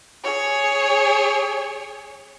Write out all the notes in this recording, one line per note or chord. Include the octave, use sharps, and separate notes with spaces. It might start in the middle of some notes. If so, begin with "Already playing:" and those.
G#4 C#5